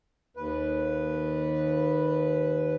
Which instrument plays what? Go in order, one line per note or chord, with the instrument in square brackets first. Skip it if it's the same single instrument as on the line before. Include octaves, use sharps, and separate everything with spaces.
[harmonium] D#2 B4